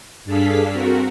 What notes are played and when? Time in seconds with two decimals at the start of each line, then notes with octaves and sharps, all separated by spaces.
0.25 G2 D4 G#4 A4 F5 B6
0.72 C4 F#4 A#4